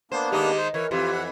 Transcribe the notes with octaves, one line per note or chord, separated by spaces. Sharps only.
A#3 B3 D4 C5
D#3 G#3 D#4 G4
C5
E3 A#4 C#5
F2 E3 F4 G4
F#5